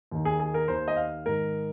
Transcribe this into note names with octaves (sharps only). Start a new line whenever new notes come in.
D#2 D#3
G#4
G#4
A#4
D#2 D#3 C5
D#5
F5
G#2 D#3 A#4